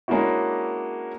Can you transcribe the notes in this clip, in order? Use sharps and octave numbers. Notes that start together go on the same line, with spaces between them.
G#3 A#3 C#4 D4 E4 F#4